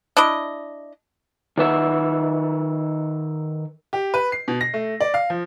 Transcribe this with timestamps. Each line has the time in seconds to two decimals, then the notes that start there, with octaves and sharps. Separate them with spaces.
0.17 D4 E4 D#5
1.58 D#3 B4 E5 F#5
3.93 G4
4.14 B4
4.32 C7
4.48 B2
4.61 A#6
4.74 A3
5.01 D5
5.14 F5
5.30 F3